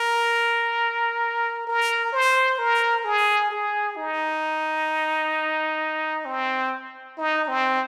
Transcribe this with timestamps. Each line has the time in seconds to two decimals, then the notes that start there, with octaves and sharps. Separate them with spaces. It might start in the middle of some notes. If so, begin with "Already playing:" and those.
Already playing: A#4
1.67 A#4
2.13 C5
2.59 A#4
3.05 G#4
3.51 G#4
3.96 D#4
6.25 C4
7.18 D#4
7.48 C4